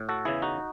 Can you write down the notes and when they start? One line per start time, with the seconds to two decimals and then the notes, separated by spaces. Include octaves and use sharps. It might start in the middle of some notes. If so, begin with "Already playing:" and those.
Already playing: A2
0.09 F#4 A4
0.25 E2 C#3 E3 E4 G#4
0.42 D#4 F#4